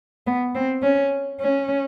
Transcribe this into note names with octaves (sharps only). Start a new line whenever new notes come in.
B3
C4
C#4
C#4